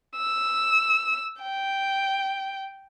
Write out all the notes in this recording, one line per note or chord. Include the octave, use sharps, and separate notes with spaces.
E6
G5